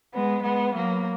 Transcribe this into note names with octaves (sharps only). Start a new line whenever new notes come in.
G#3 B3
G#3 B3
F#3 A#3